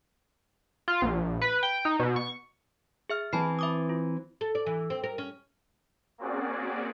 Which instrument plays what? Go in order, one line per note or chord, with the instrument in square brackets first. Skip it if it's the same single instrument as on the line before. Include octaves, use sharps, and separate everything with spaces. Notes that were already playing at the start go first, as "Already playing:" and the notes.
[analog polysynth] F4
A#1
B4
G5
D#4
B2
C#6
[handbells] G#4 E5 F6
[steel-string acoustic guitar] E3 C4 [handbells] A5 B5 C7
[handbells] E5 D6 D#6
F4
[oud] A4
D5
E3
C4
A#4
C#4
[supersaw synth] A#3 C4 C#4 F#4 G#4 D5